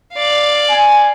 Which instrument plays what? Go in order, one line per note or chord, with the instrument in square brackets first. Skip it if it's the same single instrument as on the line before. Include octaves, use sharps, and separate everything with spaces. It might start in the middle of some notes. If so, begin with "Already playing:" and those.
[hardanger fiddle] D5 F5
[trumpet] G#5